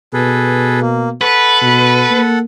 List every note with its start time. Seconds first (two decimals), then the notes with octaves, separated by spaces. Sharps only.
0.14 B2 G#4 A4 B4
0.81 A#3
1.21 A4 B4 F#5
1.62 B2
2.11 A#3